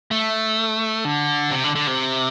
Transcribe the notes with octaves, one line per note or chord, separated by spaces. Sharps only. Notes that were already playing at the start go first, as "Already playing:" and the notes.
A3
D3
C3
D3
D3
C3